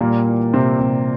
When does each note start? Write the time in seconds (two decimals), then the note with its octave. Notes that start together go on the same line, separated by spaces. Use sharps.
0.01 A#2 G3 A#3
0.27 E3
0.54 C3 C4
0.80 C3